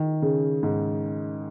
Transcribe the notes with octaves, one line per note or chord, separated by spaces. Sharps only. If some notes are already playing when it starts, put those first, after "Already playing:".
Already playing: D#3
C#3
G#2